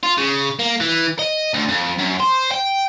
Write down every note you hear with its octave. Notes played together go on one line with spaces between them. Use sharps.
F4
C#3
A#3
E3
D#5
D2
F2
F#2
C5
G5